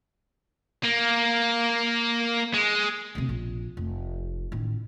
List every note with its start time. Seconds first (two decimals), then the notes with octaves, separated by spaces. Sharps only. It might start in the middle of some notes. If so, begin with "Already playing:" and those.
0.84 A#3
2.54 G#3
3.15 D2 C3
3.29 A#1
3.77 F1
4.52 A1 D#3